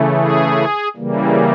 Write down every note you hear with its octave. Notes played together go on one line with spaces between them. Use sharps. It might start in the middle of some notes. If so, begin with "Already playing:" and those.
Already playing: C#3 E3 A3
G#4
C#3 E3 G3 A#3